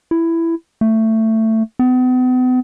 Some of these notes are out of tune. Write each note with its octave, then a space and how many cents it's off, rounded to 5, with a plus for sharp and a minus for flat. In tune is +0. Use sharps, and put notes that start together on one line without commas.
E4 +10
A3 +15
B3 +40